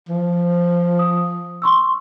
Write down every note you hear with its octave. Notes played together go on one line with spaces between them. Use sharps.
F3
D#6
C6 C#6 E6